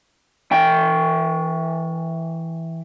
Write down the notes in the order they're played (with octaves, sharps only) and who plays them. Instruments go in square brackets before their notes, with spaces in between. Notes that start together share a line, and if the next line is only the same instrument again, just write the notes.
[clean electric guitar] E3 G5